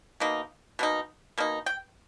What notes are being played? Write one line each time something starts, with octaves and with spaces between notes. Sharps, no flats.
B2 A#3 D#4
B2 A#3 D#4
B2 A#3 D#4
G5